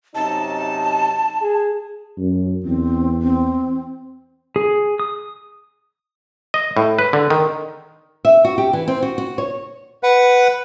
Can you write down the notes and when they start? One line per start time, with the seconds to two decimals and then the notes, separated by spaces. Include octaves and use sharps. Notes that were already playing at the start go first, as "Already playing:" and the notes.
0.15 F#2 C3 D#4 A5
1.41 G#4
2.18 F#2
2.65 E2 C4
3.22 C4
4.56 G#4
5.00 D#6
6.54 D#5
6.77 A2
6.99 B4
7.13 D3
7.30 D#3
8.25 E5
8.45 F#4
8.58 G4
8.73 E3
8.88 C4
9.02 F#4
9.18 F#4
9.38 C#5
10.03 B4 F#5